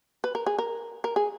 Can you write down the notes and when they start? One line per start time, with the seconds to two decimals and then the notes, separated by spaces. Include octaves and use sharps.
0.24 B4
0.35 A#4
0.46 G#4
0.58 A#4
1.04 A#4
1.16 G#4